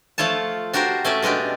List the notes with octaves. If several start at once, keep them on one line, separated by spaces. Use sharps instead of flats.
F3 A3 F4 C#5 A5
D4 F#4 G4 A#4 C5
A3 C#4 D5 E5
B2 G#3 C#4 D4 G4